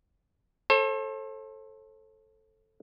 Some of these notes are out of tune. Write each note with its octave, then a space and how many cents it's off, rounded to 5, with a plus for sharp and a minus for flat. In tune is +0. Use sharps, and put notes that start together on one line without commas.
A4 +0 C5 +45